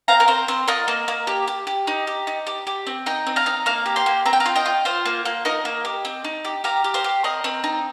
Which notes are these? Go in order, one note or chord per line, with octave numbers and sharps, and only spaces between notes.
C4 F5 A#5
A#4
C4 C5
C4 C5
F4 A#4 D#5
A#3
A#3
G4
G4
G4
D#4
G4
D#4
G4
G4
C4
D#4 D#5 G5
C4
F5 A#5
D#4
A#3 F5 A#5
G4
G5 C6
A#3
C4 A#5
G5
F5 A#5
F4
D#5 G5
F4
F4 C5 F5
A#3
A#3
D#4 A#4 D#5
A#3
G4
C4
D#4
G4
G4 F5 A#5
G4
C5 F5
G4
C4 A#4 D#5
C4
D#4